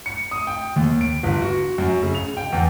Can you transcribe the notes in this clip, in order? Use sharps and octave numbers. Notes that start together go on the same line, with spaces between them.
C#7
D#6
G5
D#2
D7
G1
F#4
F#2
C#3
F7
G5
E2